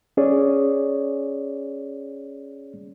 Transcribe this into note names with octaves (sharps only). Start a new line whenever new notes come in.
C#4 G#4 C#5 D5